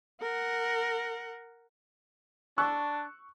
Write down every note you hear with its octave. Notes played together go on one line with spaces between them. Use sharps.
A#4 F#5
D4 C#6 E6 F#6